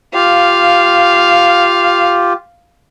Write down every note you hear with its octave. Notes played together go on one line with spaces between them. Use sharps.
F4 G4 F5